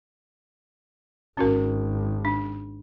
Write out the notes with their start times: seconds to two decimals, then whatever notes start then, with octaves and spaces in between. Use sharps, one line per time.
1.37 G#1 C#4 F#4 A#4
2.25 D4